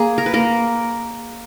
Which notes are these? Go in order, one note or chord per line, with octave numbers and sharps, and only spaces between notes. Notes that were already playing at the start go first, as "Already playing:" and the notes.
Already playing: A#3 G#4
A#4
B4
A#3 A#4